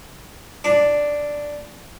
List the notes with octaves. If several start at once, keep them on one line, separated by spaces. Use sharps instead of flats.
D4